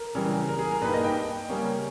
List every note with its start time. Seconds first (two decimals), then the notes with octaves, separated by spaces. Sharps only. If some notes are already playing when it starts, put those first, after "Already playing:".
Already playing: A#4
0.15 C#3 E3 G3
0.48 A#4
0.59 G#4
0.71 A#4
0.81 G2 G3 A#3 D#4 B4
0.94 D#5
1.04 G5
1.49 C#3 G3 A#3 C#4